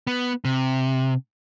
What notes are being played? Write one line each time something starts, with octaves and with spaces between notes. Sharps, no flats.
B3
C3